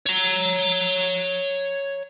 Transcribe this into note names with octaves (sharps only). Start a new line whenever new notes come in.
C#5 A#5